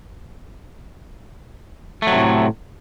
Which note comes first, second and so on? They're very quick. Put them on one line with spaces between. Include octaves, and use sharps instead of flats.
A3 F#3 C3 A2